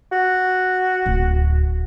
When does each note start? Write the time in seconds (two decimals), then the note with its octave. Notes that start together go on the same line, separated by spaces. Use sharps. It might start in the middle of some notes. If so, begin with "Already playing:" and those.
0.12 F#4
1.06 D1